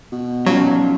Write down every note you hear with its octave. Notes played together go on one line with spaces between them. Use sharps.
B2
C#3 F3 F#3